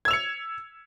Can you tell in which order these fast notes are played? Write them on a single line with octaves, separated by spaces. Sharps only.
G#6 E6 F7 C#7